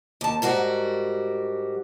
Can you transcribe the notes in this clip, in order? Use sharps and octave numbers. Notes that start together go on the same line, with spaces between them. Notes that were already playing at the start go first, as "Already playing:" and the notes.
D#2 A5
G#2 G3 F#4 A#4